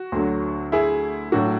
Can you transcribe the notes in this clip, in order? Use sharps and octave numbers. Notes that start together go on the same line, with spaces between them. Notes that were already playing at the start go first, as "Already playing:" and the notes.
Already playing: F#4
D2 D3 F#3
E4 G#4
A2 F#3 D4 F#4